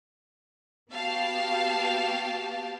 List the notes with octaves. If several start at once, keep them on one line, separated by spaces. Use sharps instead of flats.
B3 F#4 G4 F5 G5 A5